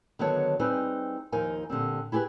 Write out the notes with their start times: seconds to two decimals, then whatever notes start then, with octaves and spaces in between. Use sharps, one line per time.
0.19 D3 D#3 F#3 B3 C#5 A5
0.59 G3 C4 D#4 G#4 B4 C5
1.32 D#2 F3 D#4 A#4 G#5
1.70 A#2 D3 G3 C4
2.12 E4 G4 G#4 A#4 B4